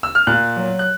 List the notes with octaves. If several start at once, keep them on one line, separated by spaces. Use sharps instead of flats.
E6
F6
A#2 F#6
F#3
F#6